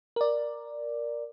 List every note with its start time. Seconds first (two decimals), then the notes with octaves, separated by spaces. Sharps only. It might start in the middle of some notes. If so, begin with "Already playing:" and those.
0.16 A#4 D5